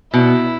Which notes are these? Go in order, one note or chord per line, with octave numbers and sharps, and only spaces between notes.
B2 E4